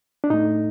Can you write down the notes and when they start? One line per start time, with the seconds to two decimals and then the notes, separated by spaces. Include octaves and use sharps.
0.24 D4
0.30 A2 A3 D#4